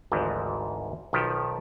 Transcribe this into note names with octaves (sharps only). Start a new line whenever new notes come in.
G#1 D2 G#2 E3 F3
B1 D#3 F3 G4